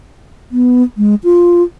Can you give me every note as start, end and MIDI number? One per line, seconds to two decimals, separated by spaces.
0.52 0.83 59
0.97 1.15 56
1.24 1.63 65